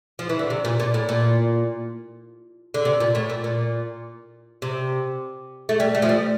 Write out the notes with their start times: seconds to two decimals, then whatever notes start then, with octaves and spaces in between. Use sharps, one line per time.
0.19 F3
0.29 E3
0.39 D3
0.50 C3
0.65 A#2
0.80 A#2
0.94 A2
1.09 A#2
2.74 D3
2.85 C3
3.00 A#2
3.15 A2
3.30 A#2
3.44 A#2
4.62 C3
5.69 A3
5.80 G3
5.95 A3
6.02 F3
6.09 G3